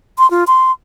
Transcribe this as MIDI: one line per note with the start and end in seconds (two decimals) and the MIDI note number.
0.19 0.29 84
0.31 0.44 65
0.47 0.72 84